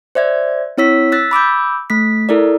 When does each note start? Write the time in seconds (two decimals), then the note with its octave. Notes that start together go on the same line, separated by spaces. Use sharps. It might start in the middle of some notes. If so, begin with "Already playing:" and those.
0.15 C5 D5 E5 G#6
0.77 C4 E4 C#5 E6 B6
1.12 E6 F#6 A6 B6
1.31 B5 D6 E6 G6
1.90 A3 B6
2.29 E4 A4 A#4 D5